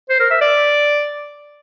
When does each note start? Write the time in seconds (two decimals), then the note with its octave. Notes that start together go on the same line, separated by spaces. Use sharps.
0.10 C5
0.20 A#4
0.31 E5
0.41 D5